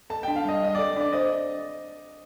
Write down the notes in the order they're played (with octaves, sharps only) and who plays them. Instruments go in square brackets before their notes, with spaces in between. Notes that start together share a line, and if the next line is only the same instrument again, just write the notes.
[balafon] A4 [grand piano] A5
[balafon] D4 [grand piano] G5
[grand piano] F5
[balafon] G3 [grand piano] D#5
[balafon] G3 [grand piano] D#5
[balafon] A4 [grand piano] D5
[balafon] D4 [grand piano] D5
[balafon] C5 [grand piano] D#5